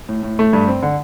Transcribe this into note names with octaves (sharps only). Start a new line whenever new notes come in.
A2
A2
A3
G2
C4
D3